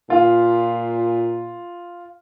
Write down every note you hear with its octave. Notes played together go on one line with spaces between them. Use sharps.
A#2 F4